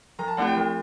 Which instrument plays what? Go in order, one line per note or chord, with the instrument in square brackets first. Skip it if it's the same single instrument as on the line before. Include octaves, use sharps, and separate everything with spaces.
[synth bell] F3 [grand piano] A#5
[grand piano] A5
[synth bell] A3 C4 E4 G4 [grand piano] F#5
[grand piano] G5
[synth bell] F3